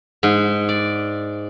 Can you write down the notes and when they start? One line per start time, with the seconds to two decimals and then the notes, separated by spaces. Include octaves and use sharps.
0.23 G#2
0.69 D5